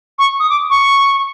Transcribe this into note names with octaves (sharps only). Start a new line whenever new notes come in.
C#6
D#6
D6
C#6